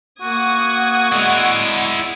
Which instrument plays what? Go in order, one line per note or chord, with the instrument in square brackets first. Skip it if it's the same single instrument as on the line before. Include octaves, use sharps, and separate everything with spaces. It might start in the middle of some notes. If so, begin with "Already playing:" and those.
[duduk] A#3 [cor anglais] F#4 [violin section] F#5 D#6 G#6
[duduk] G#3 [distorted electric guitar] E4 D5